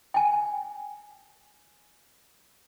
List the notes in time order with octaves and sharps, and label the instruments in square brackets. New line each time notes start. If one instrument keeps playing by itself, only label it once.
[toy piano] G5 G#5